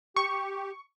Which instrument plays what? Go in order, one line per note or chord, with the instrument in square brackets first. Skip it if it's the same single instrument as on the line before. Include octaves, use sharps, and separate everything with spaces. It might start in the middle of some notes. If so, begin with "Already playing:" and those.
[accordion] G4 [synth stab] C#6